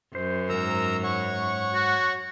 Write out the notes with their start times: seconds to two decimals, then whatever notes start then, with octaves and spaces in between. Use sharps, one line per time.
0.15 F#2 C5
0.49 F2 G#2 A#4 A#5 E6
1.03 C#5 F#5 C#6
1.74 F#4